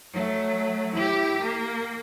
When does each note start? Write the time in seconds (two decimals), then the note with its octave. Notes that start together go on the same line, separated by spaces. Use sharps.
0.13 F#3 A3
0.94 E4 G4
1.42 A#3